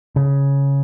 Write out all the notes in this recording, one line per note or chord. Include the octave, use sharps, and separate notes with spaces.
C#3